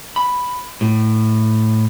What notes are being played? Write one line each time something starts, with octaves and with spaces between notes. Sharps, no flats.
B5
A2